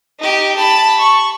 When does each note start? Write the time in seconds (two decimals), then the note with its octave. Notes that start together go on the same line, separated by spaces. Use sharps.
0.20 D#4 G4
0.56 A5 B5
0.99 C#6